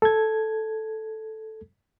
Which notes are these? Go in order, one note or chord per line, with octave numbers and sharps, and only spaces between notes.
A4 G#6